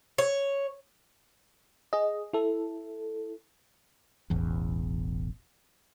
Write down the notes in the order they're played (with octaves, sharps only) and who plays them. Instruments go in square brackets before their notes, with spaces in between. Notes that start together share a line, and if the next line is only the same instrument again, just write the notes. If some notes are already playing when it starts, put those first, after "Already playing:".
[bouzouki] C#5
[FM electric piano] G#4 D#5
E4 A4
[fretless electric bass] E1 A1 E2